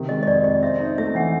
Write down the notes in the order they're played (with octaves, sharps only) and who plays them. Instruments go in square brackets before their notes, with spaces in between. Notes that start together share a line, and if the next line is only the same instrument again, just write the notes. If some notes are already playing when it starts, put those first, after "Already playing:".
Already playing: [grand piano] C3 D#3
[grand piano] G#3 [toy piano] D#5
[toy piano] D#5
[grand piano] F2 [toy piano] D5
[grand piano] F2 [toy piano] D#5
[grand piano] C4 [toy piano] E5
[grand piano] D#4
[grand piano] A3 [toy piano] E5
[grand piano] E3 [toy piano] F#5